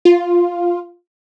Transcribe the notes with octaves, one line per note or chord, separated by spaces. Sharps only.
F4